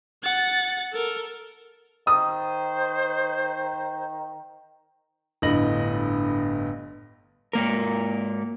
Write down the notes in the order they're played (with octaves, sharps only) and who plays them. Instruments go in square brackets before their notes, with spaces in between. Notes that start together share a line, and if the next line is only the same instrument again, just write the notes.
[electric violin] F#5 A6
A4 A#4
[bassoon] D#3 [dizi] C5 [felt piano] D#6
[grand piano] G1 A2 D3 D#5 A#6 F#7
[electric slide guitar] G#2 A#3 A#4